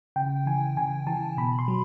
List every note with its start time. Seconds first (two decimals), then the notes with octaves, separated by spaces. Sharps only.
0.16 C#3 G5
0.46 E3 G#5
0.77 C#3 G#5
1.07 E3 A5
1.37 B2 B5
1.59 C6
1.68 F#3